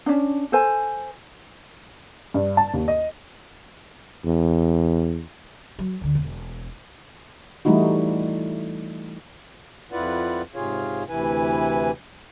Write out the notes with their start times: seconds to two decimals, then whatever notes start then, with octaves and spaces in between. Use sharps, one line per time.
0.06 C#4 D4
0.52 A4 C5 G#5
2.34 G2
2.57 A5
2.73 D#2
2.88 D#5
4.25 E2
5.79 F#3
6.01 D2 D3
6.15 E1
7.65 E3 G3 A3 D#4 E4 F#4
9.92 F2 E4 F4 B4 D5 F#5
10.55 G#2 C3 F4 G#4 C#5 F5
11.09 D2 C3 E3 E4 B4 G#5